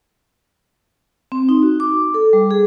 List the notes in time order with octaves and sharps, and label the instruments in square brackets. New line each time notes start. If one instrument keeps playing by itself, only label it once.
[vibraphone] C4
D#4
F#4
D6
A4
G3
G#4